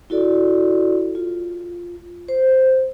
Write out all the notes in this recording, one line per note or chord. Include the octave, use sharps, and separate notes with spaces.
E4 F#4 A4 D5
F4
C5